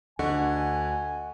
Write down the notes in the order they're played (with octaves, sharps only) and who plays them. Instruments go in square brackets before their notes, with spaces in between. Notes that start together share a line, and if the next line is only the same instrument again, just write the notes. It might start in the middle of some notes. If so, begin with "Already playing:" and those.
[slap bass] D2 [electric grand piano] D3 [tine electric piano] D#5 F#5 C#6 [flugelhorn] G#5